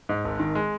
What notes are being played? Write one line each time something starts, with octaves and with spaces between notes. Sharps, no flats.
G#2
G#1
D#3
G#3